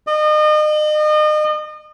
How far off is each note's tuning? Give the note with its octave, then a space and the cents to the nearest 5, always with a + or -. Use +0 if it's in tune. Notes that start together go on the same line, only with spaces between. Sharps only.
D#5 -35